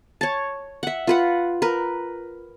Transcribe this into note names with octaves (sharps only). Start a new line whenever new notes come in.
C#5 A5
E5 F#5
F4 B4 F#5
A#4 B4